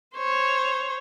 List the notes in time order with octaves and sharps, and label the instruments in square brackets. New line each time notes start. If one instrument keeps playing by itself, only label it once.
[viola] C5 C#5